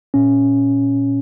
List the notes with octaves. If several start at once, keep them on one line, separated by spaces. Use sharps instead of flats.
A#2 C#4